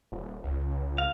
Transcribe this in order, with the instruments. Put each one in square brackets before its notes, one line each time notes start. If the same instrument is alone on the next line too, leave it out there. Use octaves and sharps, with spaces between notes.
[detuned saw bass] D#1
C#2
[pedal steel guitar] F5